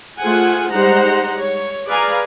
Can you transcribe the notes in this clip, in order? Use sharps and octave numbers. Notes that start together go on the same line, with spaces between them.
A3 F4 G#4 C5 F#5 G#5
G3 G#3 D#4 C5 F#5 A#5
C#5
G#4 B4 D5 F5 G#5 A#5